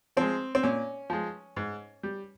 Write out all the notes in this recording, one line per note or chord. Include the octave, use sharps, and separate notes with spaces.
F3 G#3 C4
C4
A#2 C#4
F3 G#3
G#2
G3